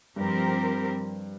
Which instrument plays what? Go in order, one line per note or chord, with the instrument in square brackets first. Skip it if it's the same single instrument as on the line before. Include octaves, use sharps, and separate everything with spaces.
[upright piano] G2 [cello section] F3 C4 G4 A#4